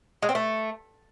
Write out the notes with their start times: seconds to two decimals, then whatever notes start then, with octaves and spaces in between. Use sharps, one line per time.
0.22 G#3
0.29 C4
0.35 A3